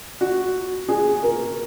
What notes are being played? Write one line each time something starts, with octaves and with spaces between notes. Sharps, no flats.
F#4
G#4
A#4